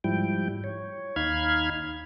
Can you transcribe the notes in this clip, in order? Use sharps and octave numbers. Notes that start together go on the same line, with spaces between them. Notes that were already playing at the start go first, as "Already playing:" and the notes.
G#2 F3 G3 E4 G5
C#5
D#2 D#4 F5 B5 F6 G#6